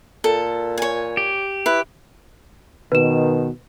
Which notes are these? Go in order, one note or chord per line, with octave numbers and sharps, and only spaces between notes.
A#2 A4
C#5 G#5
G4
E4 B4
B2 D#3 B4 E7